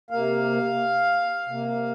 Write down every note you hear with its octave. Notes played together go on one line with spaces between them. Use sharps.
C3 A#3 F5
C3 A#3